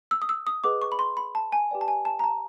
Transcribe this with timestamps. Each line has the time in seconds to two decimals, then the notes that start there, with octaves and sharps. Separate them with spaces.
0.11 E6
0.22 D#6
0.29 E6
0.47 D#6
0.64 G#4 B4 D#5 F#5 D6
0.82 C#6
0.92 B5
0.99 C6
1.17 B5
1.35 A5
1.52 G#5
1.70 G4 B4 D5 G5
1.81 A5
1.88 G#5
2.05 A5
2.19 A#5
2.24 A5